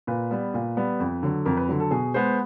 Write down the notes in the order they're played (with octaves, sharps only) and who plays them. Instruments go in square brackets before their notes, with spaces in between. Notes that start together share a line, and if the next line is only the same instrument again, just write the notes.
[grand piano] A#2 B4
G3 B3
A#2
G3 B3
F2
D3 F#3
F2 A#4
B4
D3 F#3
A4
B2 G#4
G#3 B3 C5